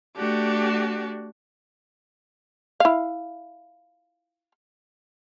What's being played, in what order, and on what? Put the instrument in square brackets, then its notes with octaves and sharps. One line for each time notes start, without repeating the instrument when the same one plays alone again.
[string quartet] A3 D4 F#4 G4
[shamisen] E4 F5